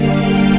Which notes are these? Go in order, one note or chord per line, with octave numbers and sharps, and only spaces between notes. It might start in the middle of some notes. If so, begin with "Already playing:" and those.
Already playing: D3 G3 A#3 F5
G5